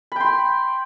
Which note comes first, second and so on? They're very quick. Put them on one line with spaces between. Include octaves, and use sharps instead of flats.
B5 G5 C6